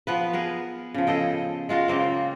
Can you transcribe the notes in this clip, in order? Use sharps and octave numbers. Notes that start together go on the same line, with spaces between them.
F3 B3 B4
B3 G#4 A#4
C#3 F3
G#4 A4 D#5 G5
G#3 F4 F#4 A#4
C#3 A#3 C4